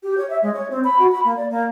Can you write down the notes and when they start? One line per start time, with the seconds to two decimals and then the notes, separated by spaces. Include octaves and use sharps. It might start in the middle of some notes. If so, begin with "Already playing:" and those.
0.03 G4
0.17 C#5
0.30 E5
0.42 G#3
0.54 C#5
0.70 C4
0.84 B5
0.99 F#4
1.12 B5
1.25 A#3
1.37 D5
1.50 A#3